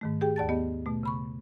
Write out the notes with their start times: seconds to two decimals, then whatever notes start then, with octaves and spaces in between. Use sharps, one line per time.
0.01 G#2 D#3 A3
0.21 G4 G#4 G5
0.36 D#2 D5 A5 A6
0.49 B3 G4 D#5
0.86 B2 A3
1.03 C#3 B5 C#6